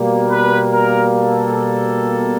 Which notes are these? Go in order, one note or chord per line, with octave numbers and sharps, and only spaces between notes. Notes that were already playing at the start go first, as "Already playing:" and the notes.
Already playing: B2 G3 A#3
B4
A#4
A4